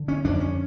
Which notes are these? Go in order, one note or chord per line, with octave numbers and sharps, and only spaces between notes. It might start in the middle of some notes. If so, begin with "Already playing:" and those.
Already playing: D3
C#4
F2 D4
C#4